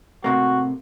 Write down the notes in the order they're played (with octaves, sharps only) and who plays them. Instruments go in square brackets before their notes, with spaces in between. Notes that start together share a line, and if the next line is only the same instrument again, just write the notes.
[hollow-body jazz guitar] A2 C3 A#3 [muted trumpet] F#4